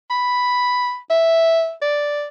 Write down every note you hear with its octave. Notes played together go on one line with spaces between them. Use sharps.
B5
E5
D5